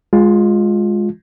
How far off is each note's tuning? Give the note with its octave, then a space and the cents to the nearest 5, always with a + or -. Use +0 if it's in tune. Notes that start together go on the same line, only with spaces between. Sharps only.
G#3 +0 F4 +15